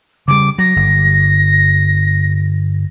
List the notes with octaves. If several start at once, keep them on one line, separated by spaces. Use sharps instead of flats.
C#3 E3 G3 D6
F#3 A#6
G1